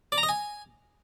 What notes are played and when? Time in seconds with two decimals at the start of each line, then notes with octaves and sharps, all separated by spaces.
0.12 D5
0.18 A#5
0.23 D#5
0.29 G#5